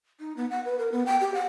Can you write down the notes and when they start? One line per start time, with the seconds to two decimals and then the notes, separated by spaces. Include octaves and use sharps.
0.20 D#4
0.37 B3
0.50 F#5
0.65 B4
0.79 A#4
0.92 B3
1.06 G5
1.21 G4
1.34 F#5